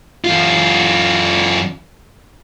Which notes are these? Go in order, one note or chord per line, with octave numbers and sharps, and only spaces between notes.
F#2 F4